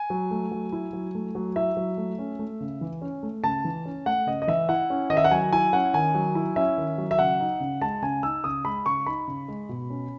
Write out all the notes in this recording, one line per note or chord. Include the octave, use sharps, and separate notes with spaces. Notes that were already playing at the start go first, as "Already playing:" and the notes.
Already playing: G#5
F#3
A3
F#3
E4
F#3
A3
F#3
E4 E5
F#3
A3
C#4
A3
C#3
E3
C#4
A3
C#3 A5
E3
C#4
A3 F#5
C#3 D#5
D#5
E3 E5
E4 F#5
C#4
D#3 D#5
E5
F#5
F#3 G#5
E4 G#5
C#4 F#5
D#3 G#5
F#3
E4
C#4 E5
D#3
F#3
E5
C#3 F#5
D#4
C#3
G#3 A5
C#3 G#5
D#4 E6
C#3 D#6
G#3 B5
C#3 C#6
D#4 B5
C#3
G#3
B2
C#4